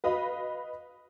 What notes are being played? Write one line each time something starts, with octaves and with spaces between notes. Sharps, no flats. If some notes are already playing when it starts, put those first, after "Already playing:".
B4 D#5 F5 B5